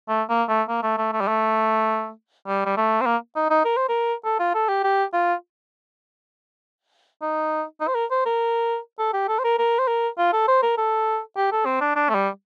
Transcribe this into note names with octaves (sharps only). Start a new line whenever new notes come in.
A3
A#3
A3
A#3
A3
A3
A3
G3
A3
G3
G3
A3
C4
A#3
D#4
D#4
A#4
C5
A#4
A4
F4
A4
G4
G4
F4
D#4
D#4
C5
A#4
C5
A#4
A4
G4
A4
C5
A#4
A#4
C5
A#4
F4
A4
C5
A#4
A4
G4
A4
C4
D4
D4
A3
G3